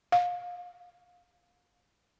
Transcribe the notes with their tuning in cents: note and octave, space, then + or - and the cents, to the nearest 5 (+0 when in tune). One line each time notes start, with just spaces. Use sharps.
F5 +30